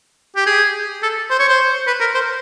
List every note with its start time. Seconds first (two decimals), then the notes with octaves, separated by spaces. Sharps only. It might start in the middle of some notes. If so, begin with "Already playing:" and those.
0.36 G4
0.46 G#4
1.03 A4
1.30 C5
1.40 C#5
1.49 C5
1.87 B4
2.00 A#4
2.14 C5